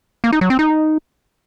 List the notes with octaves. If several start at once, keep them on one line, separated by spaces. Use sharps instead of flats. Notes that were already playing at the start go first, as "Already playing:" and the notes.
A#3
D#4
F#3
C4
D#4